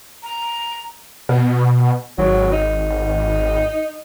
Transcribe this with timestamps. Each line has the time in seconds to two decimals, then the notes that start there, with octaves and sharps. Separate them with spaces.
0.23 A#5
1.29 B2
2.18 G#1 F#3
2.52 D#4